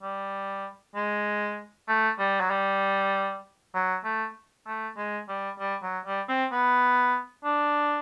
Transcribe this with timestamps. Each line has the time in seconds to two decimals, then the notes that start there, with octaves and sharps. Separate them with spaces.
0.02 G3
0.95 G#3
1.88 A3
2.19 G3
2.40 F#3
2.50 G3
3.74 F#3
4.04 A3
4.67 A3
4.97 G#3
5.28 G3
5.59 G3
5.82 F#3
6.05 G3
6.28 C4
6.52 B3
7.44 D4